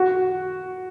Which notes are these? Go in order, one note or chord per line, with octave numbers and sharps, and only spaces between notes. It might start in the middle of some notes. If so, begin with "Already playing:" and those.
Already playing: F#4